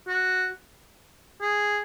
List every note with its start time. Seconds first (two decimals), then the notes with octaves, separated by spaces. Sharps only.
0.08 F#4
1.41 G#4